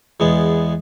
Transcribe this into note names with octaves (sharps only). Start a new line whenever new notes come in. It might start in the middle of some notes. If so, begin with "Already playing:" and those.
E2 G#3 B3